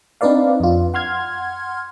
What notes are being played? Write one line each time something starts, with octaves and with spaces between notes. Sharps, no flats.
C4 D4 D#4 B4 D5 F5
F2 F4
F#5 C6 F6 G#6